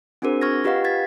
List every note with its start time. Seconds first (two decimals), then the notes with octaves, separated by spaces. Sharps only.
0.22 C4 D4 F#4 G#4 A#4 C5
0.41 C#6 F6 G#6 A#6
0.64 F4 G4 B4 D#5 F5 F#5
0.84 G#6 A6 B6